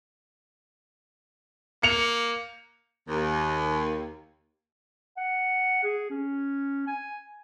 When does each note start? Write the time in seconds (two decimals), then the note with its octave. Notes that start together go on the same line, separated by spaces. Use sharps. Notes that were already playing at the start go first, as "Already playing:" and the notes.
1.83 A#3 C#7 F7
3.08 D#2
5.17 F#5
5.83 G#4
6.10 C#4
6.87 G#5